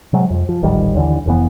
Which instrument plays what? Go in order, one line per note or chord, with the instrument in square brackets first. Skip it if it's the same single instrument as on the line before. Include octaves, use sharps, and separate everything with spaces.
[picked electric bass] C3 F#3 G#3
F2
F3
D#1 A1 D#3 G3
D#2 D3 E3
F1 F2 E3 B3